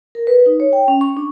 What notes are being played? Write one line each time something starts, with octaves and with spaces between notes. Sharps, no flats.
A#4
B4
D#4
C#5
G5
C#4
C#6
D4